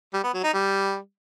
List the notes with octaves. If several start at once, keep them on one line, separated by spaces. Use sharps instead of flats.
G3
B3
F#3
D#4
G3